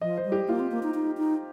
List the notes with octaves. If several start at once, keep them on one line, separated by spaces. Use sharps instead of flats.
F3 D#5
C5
G3
G4
A#3 F4
C4
A#3
D#4
D#4
D#4